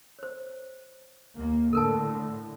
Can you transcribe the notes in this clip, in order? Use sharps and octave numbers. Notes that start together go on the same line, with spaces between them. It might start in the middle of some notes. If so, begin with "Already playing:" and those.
C5 C#5
D#2 A#3
A2 D3 A4 A#4 A5